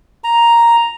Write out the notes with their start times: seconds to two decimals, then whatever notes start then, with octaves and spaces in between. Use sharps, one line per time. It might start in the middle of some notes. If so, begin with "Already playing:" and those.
0.24 A#5